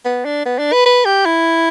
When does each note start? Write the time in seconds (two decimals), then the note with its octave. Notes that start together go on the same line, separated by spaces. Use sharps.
0.05 B3
0.25 D4
0.45 B3
0.59 D4
0.73 B4
0.86 B4
1.05 G4
1.26 E4